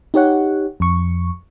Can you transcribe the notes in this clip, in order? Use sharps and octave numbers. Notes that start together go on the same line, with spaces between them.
D#4 G4 C#5 F#5
F2 C#6